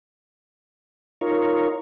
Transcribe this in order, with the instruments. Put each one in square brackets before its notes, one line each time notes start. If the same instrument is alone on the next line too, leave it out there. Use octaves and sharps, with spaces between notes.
[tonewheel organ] D#4 F4 A#4 C#5